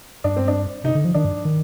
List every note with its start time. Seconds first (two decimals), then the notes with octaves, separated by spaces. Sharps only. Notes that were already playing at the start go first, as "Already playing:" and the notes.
0.24 G2 D4
0.36 C4
0.48 D4
0.84 C3 D#4
0.95 D3
1.05 F3
1.14 D#3 D4
1.25 G2
1.45 D#3